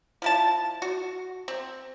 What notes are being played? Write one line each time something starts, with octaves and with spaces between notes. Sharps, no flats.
F3 E4 A5
F#4
C4